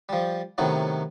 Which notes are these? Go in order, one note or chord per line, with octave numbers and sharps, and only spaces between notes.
F3 G3
A2 C3 D#3 F#3 B3